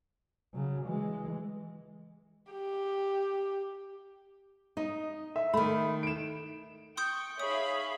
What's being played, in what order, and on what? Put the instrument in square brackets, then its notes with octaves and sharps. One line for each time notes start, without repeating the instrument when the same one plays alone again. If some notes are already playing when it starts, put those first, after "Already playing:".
[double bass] C#3 F#3
E3 G#3
[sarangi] G4
[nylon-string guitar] D#4 [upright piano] D#5
[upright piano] E5
[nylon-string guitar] D#3 A3 [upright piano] B5
[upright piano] D7 E7
[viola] G5 C#6 [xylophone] C6 D#6 G6
[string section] D#4 E5 F5 [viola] G#4 B5 [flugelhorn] C#5 [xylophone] D#6